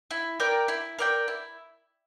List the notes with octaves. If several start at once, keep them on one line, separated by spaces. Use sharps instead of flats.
E4
A#4 D5 G5
E4
A#4 D5 G5
E4